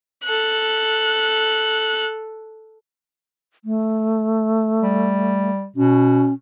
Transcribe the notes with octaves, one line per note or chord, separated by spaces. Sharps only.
A4 F#6
A3
G3
B2 C#4